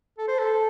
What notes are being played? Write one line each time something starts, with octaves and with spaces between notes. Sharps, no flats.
A4
C5
A4